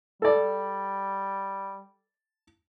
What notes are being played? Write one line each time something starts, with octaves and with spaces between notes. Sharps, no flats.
G3 A4 D5